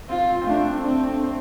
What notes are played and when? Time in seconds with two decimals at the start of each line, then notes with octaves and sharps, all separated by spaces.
0.09 C4 F4
0.41 C4
0.47 A3 D4
0.85 C4
1.23 C4